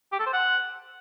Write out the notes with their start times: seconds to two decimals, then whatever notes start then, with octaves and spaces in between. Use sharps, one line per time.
0.12 G4
0.19 A4
0.26 C5
0.33 F#5